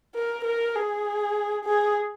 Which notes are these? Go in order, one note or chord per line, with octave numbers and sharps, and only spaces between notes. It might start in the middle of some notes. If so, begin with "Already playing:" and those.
A#4
A#4
G#4
G#4